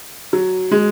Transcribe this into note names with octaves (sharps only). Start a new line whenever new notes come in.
F#3
G#3